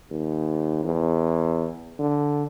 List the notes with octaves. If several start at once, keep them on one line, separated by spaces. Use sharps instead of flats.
D#2
E2
D3